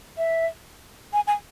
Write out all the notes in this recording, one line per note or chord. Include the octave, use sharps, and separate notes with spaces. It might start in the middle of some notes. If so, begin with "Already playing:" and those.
E5
G#5
G#5